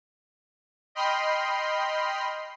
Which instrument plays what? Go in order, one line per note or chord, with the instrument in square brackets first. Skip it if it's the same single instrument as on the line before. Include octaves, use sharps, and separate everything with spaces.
[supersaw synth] D#5 G5 B5 C6 F6 C7